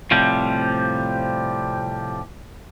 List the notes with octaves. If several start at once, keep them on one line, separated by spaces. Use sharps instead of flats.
A2 C3 F3 G3